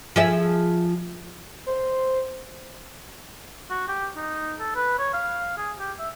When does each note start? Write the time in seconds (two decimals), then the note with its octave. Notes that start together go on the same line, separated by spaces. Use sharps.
0.16 F3 G#4 E5
1.66 C5
3.70 F#4
3.88 G4
4.16 D#4
4.59 A4
4.76 B4
4.99 C#5
5.14 F5
5.57 G#4
5.79 G4
5.99 E5